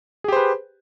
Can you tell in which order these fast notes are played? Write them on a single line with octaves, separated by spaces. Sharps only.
G#4 G4 C5 B4